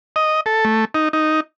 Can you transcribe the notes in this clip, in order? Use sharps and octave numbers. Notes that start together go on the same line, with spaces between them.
D#5
A4
A3
D#4
D#4